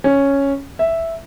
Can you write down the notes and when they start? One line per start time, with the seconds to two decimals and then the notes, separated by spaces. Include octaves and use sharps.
0.04 C#4
0.79 E5